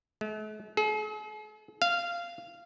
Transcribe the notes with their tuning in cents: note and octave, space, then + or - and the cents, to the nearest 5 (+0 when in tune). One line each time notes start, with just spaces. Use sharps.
A3 -45
G#4 +45
F5 -15